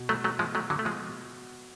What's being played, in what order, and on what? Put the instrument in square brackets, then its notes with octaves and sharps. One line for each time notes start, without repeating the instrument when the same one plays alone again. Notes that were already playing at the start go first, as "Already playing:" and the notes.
Already playing: [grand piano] B2 F#4
[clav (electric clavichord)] F#3 A3
F#3 A3
F3 G#3
F#3 A3
D3 F#3
A3
F3 G#3